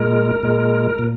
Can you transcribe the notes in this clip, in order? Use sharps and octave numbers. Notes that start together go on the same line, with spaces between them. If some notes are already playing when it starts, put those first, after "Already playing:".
Already playing: A#2 G#3 A#4
A#2 G#3
A#2